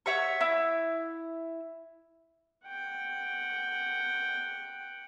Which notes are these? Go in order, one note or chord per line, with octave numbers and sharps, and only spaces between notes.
C#5 E5 F#5 C#6
E4
F#5 G5